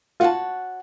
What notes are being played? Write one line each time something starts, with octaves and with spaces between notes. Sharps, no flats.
F4 F#4 C#5 F#5 A5